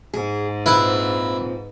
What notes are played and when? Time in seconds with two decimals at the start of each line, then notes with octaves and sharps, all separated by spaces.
0.14 G#2 G#4
0.66 A#2 C4 E4 F4 B4